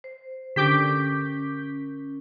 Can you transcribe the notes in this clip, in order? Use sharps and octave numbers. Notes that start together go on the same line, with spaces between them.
C5
D3 C#4 G4 A#4 D6 G6 B6